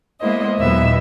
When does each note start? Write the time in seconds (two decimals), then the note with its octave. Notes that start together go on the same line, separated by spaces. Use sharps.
0.21 G#3 A#3 B3 E4 C5 D#5
0.58 D#2 A#2 F#3 B3 B4 E5